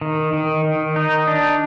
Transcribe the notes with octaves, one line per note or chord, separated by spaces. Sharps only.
D#3
D#3
D#3
D#4
D4